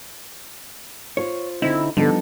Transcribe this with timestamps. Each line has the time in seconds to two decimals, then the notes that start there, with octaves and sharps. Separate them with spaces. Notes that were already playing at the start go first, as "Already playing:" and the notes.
1.17 F4 C5 C#5
1.62 D3 C4 D#4 E4
1.97 D3 F3 G3 B3 D4 D#4 A4